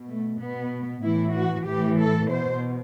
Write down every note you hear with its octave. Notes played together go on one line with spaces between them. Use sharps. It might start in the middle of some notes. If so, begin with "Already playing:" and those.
Already playing: B2
A3
B2 B3
A2 E3 E4
F#4
A2 E3 G4
A4
B2 C5